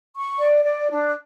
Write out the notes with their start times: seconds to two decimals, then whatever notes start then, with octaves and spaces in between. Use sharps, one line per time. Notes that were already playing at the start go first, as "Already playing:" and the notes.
0.15 C#6
0.39 D5
0.65 D5
0.90 D4